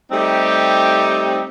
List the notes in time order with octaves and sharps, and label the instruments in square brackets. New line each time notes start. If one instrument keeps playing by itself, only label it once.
[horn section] G3 A3 C4 D#4 G4